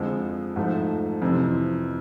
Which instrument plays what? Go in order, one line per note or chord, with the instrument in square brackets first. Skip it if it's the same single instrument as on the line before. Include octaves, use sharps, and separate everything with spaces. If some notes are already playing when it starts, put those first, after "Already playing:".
Already playing: [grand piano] F2 D3 F3 G#3
G#2 F3 A3
F2 C3 E3